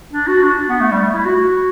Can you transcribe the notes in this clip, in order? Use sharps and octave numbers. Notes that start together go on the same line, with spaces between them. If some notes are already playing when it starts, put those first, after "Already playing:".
D4
F#4
D4
B3
A3
G3
A3
E4
F#4
F#4